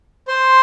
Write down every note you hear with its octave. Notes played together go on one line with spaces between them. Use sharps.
C5 C6